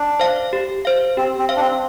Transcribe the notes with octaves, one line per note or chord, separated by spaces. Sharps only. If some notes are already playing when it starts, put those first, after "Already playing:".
Already playing: D4
C5 F5
G4
C5 F5
C4 G4
C4
C5 F5
D4
C4